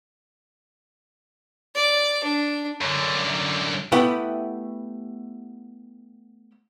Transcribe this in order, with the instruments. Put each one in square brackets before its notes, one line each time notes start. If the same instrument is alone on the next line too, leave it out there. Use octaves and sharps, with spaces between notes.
[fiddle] D5
D4
[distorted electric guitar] F#2 D3
[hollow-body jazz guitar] A3 B3 E4 G4 B4 G5